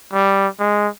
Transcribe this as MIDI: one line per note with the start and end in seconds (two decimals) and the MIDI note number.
0.13 0.47 55
0.60 0.88 56